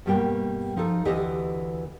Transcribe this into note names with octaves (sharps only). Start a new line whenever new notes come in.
G2 B2 G3 A#3 G5
F3 D#4 F4 A4
D2 E3 G4 B4 D#5